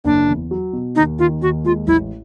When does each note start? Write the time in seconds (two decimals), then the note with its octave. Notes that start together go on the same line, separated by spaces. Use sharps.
0.05 F#1 D4
0.28 E2
0.51 F#3
0.73 B2
0.96 D#2 D#4
1.19 D#3 F4
1.41 D#2 F#4
1.64 G#3 F4
1.87 A1 E4